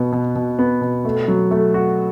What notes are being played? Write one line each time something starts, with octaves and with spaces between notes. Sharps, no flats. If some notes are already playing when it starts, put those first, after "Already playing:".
Already playing: B2 B3
B2
B2
B3
B2
A3
F#3
A3
F#4